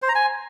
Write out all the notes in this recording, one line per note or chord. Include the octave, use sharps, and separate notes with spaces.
C5
A#5
G#5